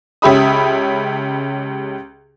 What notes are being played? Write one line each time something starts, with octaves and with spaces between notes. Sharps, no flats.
C#2 C#4 G4 E5 B5 D#6